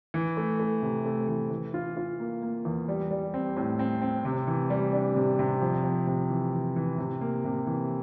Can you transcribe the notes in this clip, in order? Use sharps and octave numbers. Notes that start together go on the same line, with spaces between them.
E3
A3
A3
C3
A3
E3
E3
F4
F4
A#3
A#3
E2
G3
G3
C4
A2
C4
C4
C3
E3
G3
D4
C3
C3
F2
F2
C3
E3
E3
E3
C3
A#3
C3
E3